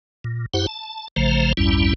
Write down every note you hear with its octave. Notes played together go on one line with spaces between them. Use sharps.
A#2
F#2 E4 G4 C5 F#5
A5
A1 C#3 F3 A3 C5 A#5
A#1 E2 G2 G3 C#4 E4